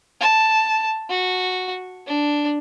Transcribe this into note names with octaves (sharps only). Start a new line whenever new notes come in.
A5
F#4
D4